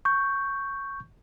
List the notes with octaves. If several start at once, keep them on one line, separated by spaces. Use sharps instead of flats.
C#6 G6